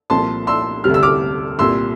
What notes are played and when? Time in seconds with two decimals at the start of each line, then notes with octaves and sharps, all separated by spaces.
0.10 C2 A#2 F3 A5 C6
0.47 C6 E6
0.84 D2 C3 G3 F6
0.94 E6
1.03 D6 F6
1.59 C2 A#2 G3 C6 E6